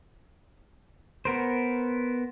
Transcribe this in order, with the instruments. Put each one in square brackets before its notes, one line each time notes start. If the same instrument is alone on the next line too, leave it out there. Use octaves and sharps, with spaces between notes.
[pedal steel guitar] B3 A#4 C5